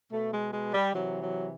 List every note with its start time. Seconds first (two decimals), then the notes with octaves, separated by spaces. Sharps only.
0.12 B2 A3
0.32 G#3
0.53 G#3
0.74 G3
0.94 C3 E3 F#3
1.21 F#3